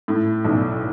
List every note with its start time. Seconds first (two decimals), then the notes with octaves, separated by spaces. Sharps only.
0.08 A2
0.44 B1